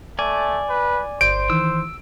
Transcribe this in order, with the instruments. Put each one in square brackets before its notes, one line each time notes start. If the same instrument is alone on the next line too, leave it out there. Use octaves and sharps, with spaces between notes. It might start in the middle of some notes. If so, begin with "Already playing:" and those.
[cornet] A3 [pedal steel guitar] D5 G#5
[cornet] B4
[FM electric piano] G1 D5 G6 [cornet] C5 [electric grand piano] D7
[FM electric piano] D#3 E3 [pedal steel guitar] E6